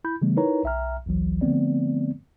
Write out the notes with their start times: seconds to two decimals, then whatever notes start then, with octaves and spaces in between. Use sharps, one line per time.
0.04 E4 B5 G6
0.22 C#3 E3 G3 A3 B3
0.37 D#4 E4 A#4 B4 C#5 A#5
0.64 B1 E5 G5 A#5 F6
1.06 A1 D2 E3 F#3
1.41 D3 F3 A3 B3 C4 D5